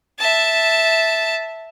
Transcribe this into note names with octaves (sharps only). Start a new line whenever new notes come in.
E5 A5